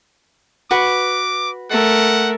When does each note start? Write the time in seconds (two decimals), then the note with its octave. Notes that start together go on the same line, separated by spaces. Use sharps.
0.71 F#4 B4 D6
1.71 A3 A#4 F#5